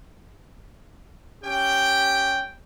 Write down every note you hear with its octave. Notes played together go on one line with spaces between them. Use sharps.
C#4 G4 G5